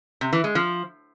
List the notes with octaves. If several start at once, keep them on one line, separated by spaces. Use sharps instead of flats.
C3
E3
G#3
F3